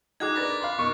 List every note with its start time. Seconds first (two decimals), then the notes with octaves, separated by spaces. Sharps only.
0.20 D#4 F#4 G#4 D6 F#6 G#6
0.36 D4 A#4 B4 A6 A#6
0.61 F5 B5 C6
0.78 B2 D#3 C#6